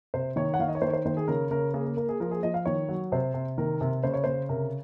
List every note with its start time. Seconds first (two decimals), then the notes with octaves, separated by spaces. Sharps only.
0.14 C3 C5
0.36 D#3 C#5
0.54 F#5
0.59 D#3 F5
0.68 D#5
0.75 C#5
0.82 D#3 C5
0.88 C#5
0.93 C5
1.05 D#3 C5
1.17 G#4
1.28 C#3 A#4
1.51 C#3 A#4
1.74 A#3 G#4
1.85 A#4
1.97 A#3 A#4
2.09 G#4
2.20 F3 A#4
2.31 G#4
2.43 F3 D#5
2.54 F5
2.66 D#3 C#5
2.89 F#3
3.12 C3 C5
3.34 C3
3.58 D#3 A#4
3.81 C3
4.03 C#3 C5
4.14 C#5
4.24 C#3 C5
4.49 C3 A#4